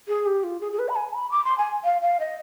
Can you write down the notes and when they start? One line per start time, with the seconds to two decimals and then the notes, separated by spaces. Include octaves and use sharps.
0.08 G#4
0.26 G4
0.44 F4
0.61 G#4
0.72 G#4
0.79 B4
0.89 B5
0.96 G#5
1.14 B5
1.31 D6
1.44 C6
1.58 G#5
1.84 F5
2.02 F5
2.20 D#5